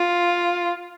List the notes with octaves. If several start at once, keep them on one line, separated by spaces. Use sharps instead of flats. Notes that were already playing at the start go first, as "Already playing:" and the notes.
Already playing: F4